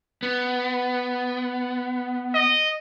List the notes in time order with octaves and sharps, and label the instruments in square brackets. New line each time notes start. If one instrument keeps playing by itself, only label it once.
[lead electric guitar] B3
[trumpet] D#5